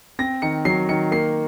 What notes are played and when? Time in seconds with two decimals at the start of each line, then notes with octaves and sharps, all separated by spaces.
0.19 C4 A#6
0.42 D#3 C#7
0.65 F#3 C7
0.89 D#3 C#7
1.12 A#3 C7